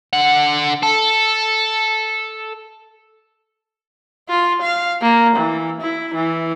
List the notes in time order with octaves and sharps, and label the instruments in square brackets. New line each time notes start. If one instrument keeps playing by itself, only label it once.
[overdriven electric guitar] D3 F#5
A4
[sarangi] F4
F5
A#3
E3
E4
E3